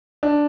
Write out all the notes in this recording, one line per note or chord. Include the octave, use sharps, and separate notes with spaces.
D4